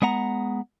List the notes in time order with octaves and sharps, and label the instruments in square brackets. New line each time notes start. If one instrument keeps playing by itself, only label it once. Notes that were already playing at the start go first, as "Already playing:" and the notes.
[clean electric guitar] G#3 B3 F#5 A#5